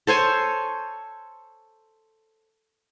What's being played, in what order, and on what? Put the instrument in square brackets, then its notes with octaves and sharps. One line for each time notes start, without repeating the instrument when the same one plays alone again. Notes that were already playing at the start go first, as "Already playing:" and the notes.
[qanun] A4 C5 C#5 G#5